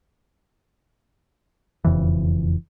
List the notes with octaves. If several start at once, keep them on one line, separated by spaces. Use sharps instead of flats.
E1 F2 C#3 E3